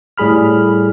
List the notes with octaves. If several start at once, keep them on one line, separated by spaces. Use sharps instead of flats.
A2 G3 G#4 B5 F6